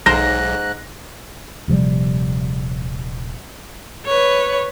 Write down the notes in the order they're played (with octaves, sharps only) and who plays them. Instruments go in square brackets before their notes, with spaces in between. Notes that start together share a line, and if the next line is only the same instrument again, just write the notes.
[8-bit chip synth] B1 [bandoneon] G#2 F#6 [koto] A#4 C5 [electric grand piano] A#6
[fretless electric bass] D#1 C3 F3 G3
[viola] B4 C#5